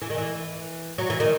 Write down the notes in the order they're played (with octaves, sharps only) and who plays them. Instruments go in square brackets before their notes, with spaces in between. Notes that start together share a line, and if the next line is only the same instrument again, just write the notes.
[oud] E3
D#3
E3
F#3
E3
D#3